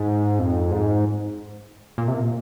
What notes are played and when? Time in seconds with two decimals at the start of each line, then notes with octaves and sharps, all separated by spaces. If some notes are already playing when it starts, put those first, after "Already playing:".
Already playing: G#2
0.39 F2
0.71 G#2
1.98 A#2
2.08 C3
2.14 A#2